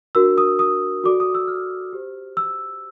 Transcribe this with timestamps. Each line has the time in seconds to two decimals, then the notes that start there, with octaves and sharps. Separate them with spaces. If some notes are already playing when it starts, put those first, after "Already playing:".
0.15 D4 F#4 A#4 E6
0.38 D#6
0.59 D#6
1.04 F#4 A4 D5 D6
1.20 D#6
1.35 E6
1.48 F6
1.93 G4 C5
2.37 E6